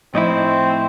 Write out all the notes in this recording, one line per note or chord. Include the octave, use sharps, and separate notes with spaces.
A2 F3 C4 D#4 E4